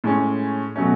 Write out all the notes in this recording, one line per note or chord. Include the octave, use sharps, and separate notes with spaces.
A2 G#3 C#4
B2 F#3 A3 C#4